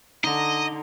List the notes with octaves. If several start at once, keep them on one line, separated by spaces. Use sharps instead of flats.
D3 D#4 D#5 A#5